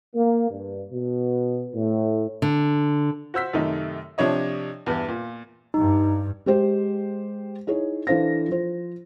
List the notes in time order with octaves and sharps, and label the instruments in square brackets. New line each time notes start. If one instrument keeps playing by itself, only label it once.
[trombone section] A#3
G2
B2
A2
[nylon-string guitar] D3
[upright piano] F#4 C5 E6 B6
F#2 C3 D#3 A3 D#4
C3 F3 D4 C#5 D#5
E2 G2 E3 B3
A#2
[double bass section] G2 [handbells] D#4
[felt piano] G#3 G4 C5
D#4 E4 G#4 C#5
E3 D4 A4 C5 F5 A#6
F3 C5